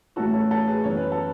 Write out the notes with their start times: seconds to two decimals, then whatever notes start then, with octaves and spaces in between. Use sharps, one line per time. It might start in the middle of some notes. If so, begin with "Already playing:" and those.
0.16 A2 E3 A3 C#4 F#4 A4
0.33 A4 C#5
0.50 A4 C#5
0.67 G#4 B4
0.84 F#2 E3 B3 C#5
0.97 B4
1.12 A4